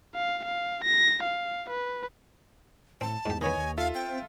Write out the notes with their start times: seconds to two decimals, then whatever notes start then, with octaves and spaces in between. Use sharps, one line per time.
0.15 F5
0.45 F5
0.84 A#6
1.23 F5
1.70 B4
3.01 A2 C4 A5
3.26 E2 G#2 G4
3.41 D#3 B3 C#5 D#5 G#5
3.58 D#2
3.78 F4 A4 E5 F5
3.95 C4 G5